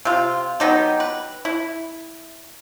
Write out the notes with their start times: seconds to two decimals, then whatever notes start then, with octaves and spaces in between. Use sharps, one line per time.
0.05 C3 F4
0.60 F#3 B3 D#4 G4
1.00 B4
1.45 E4